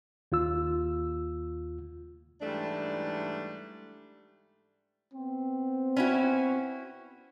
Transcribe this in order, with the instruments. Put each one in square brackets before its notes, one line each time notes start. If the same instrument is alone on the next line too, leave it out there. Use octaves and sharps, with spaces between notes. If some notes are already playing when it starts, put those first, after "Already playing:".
[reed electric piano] D#2 F4 E6
[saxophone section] G#2 E3 G3 A3 D4
[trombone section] B3 C4
[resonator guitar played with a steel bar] C#4 E4 F#4